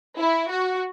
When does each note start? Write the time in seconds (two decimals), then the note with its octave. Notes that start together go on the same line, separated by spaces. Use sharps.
0.18 E4
0.49 F#4